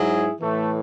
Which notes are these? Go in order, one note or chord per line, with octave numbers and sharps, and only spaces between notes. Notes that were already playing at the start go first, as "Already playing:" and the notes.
Already playing: G#2 F#3 E4 G#4
A2 E3 A3